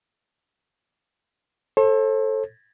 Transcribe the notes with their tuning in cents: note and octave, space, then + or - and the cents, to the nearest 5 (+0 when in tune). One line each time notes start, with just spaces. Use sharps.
A4 +0 C5 +45